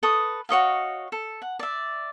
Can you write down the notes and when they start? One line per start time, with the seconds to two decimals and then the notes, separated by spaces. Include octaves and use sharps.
0.03 A4 B4 C#6 D#6
0.49 F#4 C#5 D#5 F5
1.12 A4
1.42 F#5
1.59 D5 E5